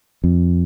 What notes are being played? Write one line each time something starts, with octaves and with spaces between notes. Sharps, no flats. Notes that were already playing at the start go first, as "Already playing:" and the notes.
F2